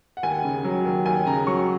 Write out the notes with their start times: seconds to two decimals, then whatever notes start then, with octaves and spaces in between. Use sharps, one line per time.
0.17 F#5
0.23 D#2 G#5
0.44 C#3
0.64 F#3
0.85 D#2
1.06 D#2 G#5
1.26 C#3 A#5
1.47 F#3 C#6